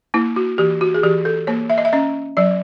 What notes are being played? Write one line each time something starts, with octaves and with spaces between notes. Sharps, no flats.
A#3 E4
F#4
E3 G4
F#4
G#4
E3 G4
A4
A#3 C#5
E5
D#5
E5
C#4 D#5
F#3 D5